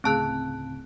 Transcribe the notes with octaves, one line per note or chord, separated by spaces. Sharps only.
D2 A2 C#3 A3 C4 G#4 A5 F#6